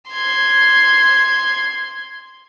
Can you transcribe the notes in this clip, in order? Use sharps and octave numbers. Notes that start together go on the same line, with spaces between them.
C6 G#6